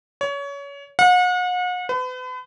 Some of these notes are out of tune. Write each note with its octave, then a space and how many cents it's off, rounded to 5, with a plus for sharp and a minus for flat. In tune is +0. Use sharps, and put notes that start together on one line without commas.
C#5 +25
F#5 -40
B4 +40